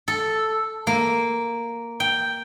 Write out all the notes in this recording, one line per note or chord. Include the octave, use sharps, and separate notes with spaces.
A4
A#3
G5